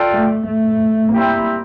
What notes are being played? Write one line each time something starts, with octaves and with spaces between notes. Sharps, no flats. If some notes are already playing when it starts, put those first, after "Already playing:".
Already playing: F4 A4 D5 G5
A3
A3
G3 A#3 C4 E4 G4